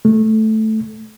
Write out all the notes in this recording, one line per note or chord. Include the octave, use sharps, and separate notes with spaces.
A3